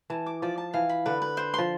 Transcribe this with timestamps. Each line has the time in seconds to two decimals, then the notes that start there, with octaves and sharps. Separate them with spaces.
0.10 E3 A5
0.26 D6
0.42 F3 D5
0.58 A5
0.74 E3 F5
0.89 B5
1.06 D3 B4
1.22 B4
1.37 C5
1.54 F3 C6